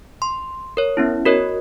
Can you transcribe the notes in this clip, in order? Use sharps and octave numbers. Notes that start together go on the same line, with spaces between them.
C6
A#4 C#5
B3 C#4 E4
F#4 A#4 C#5 D#5